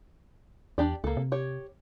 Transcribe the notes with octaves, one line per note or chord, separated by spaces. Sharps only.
E2 D4 G4 D5
C#2 A#3 A4
C3
G4 C#5